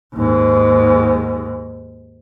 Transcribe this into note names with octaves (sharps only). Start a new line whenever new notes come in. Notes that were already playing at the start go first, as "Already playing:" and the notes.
D#2 G#2